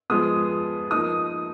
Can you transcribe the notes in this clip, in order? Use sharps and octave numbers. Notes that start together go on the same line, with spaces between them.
F3 G#3 B3 D#6
F3 A#3 D#4 D#6